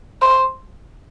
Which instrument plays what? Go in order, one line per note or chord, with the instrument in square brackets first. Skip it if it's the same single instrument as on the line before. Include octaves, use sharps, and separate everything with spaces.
[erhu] C5